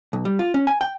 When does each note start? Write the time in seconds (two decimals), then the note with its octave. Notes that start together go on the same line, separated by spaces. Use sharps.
0.13 B1
0.25 G3
0.39 F4
0.54 C#4
0.67 G#5
0.81 G5